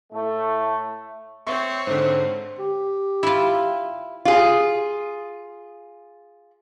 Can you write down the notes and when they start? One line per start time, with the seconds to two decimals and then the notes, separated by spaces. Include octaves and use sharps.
0.13 A2 A3
1.47 C4 C#5 E5 C6 C#6
1.87 G#2 D3 C5
2.59 G4
3.23 E4 F4
4.25 F4 G#4